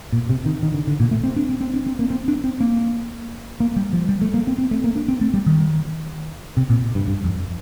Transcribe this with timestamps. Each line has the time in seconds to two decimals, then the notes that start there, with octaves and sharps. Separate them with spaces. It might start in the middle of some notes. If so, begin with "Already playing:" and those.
0.13 A#2
0.30 C3
0.46 D#3
0.63 D#3
0.74 D3
0.87 D3
1.00 A#2
1.11 A3
1.24 C4
1.37 D4
1.49 C4
1.61 C4
1.74 D4
1.87 C4
1.99 A#3
2.10 C4
2.28 D4
2.44 C4
2.61 A#3
3.60 A#3
3.76 G3
3.93 F3
4.09 G3
4.22 A3
4.34 A#3
4.47 C4
4.58 C4
4.71 A3
4.84 A#3
4.96 D4
5.08 C4
5.21 A3
5.34 G3
5.46 D#3
6.57 C3
6.70 A#2
6.95 G2
7.08 G2
7.24 F2